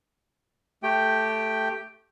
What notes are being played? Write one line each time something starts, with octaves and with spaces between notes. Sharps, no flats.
A3 G4 G5